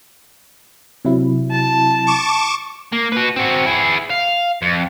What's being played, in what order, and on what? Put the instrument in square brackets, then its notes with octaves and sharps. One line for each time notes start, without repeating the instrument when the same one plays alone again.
[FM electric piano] C3 F#3 E4
[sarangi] A5
[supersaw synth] C#6 D6 E7
[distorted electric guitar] A#3
F#4 B4
C4 F#4
E4 G#4
F5
F2